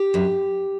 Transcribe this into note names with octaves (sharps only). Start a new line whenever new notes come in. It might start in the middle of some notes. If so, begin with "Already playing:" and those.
Already playing: G4
F#2